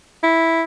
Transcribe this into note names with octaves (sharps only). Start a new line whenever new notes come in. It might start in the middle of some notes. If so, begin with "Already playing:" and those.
E4